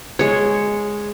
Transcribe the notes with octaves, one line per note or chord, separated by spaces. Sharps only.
G#3 C#5